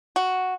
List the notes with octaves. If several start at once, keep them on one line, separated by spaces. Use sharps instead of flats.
F#4